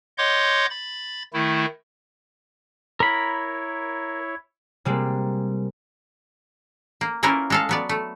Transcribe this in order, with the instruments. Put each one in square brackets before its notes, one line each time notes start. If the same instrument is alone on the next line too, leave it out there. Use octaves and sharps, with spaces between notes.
[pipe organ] C#5 D#5 F#5 C6 D6 G6
B5 A6
D#3 A3 E4
[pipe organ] E4 C#5 [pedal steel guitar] A#4 B5
[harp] C3 G3 G#3 A#3
[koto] A#3
A#3 C#4 E4 F4 A#4 B4
G#3 A4 F5
F#3 B3 D5
A3